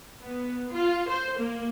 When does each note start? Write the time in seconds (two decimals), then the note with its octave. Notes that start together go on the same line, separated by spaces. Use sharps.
0.20 B3
0.71 F4
1.08 C5
1.38 A#3